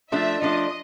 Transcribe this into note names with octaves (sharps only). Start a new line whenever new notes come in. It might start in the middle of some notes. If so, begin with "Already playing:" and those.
F3 A3 D4 E5
F3 A3 D4 D#5